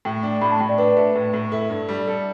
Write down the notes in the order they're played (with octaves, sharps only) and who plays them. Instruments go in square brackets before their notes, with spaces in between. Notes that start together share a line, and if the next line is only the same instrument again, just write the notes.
[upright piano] A2 [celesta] G5
[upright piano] D4
[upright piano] A2 [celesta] B5
[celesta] A5
[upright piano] A2 [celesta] G5
[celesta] D5
[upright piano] D4 [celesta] B4
[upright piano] A3
A2
A2
[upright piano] E4 [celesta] A4
[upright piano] G2
G3
A4